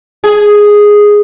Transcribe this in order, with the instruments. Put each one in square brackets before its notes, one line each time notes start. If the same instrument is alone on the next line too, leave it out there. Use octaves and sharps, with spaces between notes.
[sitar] G#4